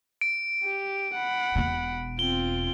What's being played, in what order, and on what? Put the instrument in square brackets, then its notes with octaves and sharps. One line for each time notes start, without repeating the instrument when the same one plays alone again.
[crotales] D7
[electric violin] G4
F#5 B5
[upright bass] E1 B2
[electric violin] C4 F4 [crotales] G7